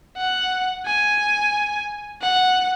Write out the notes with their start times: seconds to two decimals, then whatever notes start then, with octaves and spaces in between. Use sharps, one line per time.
0.17 F#5
0.86 G#5
2.22 F#5